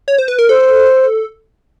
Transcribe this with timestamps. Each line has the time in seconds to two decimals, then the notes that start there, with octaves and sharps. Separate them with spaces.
0.08 C#5
0.18 C5
0.28 B4
0.39 A#4
0.49 A4 C5